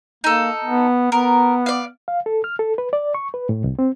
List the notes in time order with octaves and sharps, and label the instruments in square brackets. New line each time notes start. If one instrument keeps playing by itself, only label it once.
[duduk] A#3 [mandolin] D#4 A4
[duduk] B3
[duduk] B3 [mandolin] A#4
[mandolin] D5 F5
[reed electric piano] F5
A4
F6
A4
B4
D5
C#6
B4
A2
C2
C4